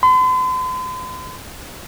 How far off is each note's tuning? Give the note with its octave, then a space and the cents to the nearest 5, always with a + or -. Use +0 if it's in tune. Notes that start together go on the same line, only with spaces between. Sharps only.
C6 -45